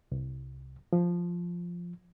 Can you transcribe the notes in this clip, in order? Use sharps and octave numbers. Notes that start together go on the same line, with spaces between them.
C2
F3